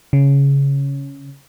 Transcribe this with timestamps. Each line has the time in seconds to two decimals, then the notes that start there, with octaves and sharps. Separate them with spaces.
0.13 C#3